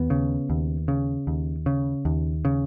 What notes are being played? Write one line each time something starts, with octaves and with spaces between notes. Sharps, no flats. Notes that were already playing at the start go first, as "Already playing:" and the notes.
Already playing: D#2 B3
C#3
D#2
C#3
D#2
C#3
D#2
C#3